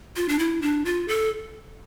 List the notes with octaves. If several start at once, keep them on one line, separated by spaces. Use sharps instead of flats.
F4
D4
E4
D4
F4
A4